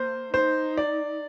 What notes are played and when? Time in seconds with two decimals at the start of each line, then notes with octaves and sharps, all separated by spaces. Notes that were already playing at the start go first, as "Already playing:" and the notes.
Already playing: A#3 C5
0.33 D#4 C5
0.77 D5